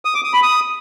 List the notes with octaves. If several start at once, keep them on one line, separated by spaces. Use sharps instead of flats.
D#6
D6
D#6
B5
D#6